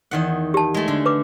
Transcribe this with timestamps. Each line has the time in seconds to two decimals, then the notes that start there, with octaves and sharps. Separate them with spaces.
0.11 E2 D#3 F#5
0.54 G4 A5
0.74 G#3 A3
0.88 D3
1.06 B4 D6